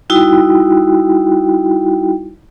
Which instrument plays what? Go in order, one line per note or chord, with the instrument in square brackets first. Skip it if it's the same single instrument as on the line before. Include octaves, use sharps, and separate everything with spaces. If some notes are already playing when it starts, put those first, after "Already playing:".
[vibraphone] G3 D#4 E4 F#4 G5